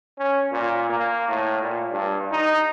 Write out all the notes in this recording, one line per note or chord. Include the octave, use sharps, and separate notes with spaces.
C#4
A#2
A#3
A2
A#2
G2
D#4